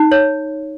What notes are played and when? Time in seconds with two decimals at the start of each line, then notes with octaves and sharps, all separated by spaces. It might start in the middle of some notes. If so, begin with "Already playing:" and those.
Already playing: D#4
0.12 C#5